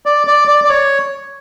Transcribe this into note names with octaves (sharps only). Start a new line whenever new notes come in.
D5
D5
D5
D5
C#5